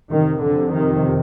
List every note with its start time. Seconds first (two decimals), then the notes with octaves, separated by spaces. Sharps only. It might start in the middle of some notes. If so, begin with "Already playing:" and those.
0.11 F2 C3 D#3
0.41 D3
0.72 D#3